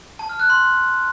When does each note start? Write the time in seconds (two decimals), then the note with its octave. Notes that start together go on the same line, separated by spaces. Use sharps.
0.19 A5
0.29 F6
0.40 F#6
0.50 C6